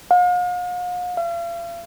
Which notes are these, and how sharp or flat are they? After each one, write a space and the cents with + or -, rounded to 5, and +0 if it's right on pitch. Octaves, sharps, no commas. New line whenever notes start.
F5 +45
F5 -40